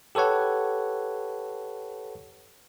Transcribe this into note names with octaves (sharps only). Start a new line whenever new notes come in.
G4 A4 B4 C#5 F#5